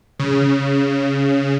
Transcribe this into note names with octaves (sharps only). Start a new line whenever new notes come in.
C#3